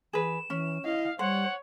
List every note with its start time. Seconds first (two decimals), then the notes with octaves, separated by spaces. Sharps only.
0.13 E3 G#4 B4 E7
0.50 E3 C#4
0.85 E4 D#5 F5
1.19 G3 C5 C#5 F#5